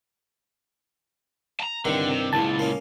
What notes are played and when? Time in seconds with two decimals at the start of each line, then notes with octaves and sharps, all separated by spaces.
1.60 A5 A#5
1.85 C2 G2 D3 D#3
2.09 C3
2.33 C#2 A#2 E4 A5
2.59 A#3 C#4